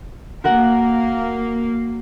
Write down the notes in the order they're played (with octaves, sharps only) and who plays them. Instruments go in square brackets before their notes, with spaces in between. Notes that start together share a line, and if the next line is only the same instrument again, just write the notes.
[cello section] A#3 [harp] F#4 A#4 F#5